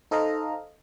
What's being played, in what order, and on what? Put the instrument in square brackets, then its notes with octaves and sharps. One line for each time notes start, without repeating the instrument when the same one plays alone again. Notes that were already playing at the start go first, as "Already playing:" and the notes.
[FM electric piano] D#4 A4 C5 D#5 F5 A#5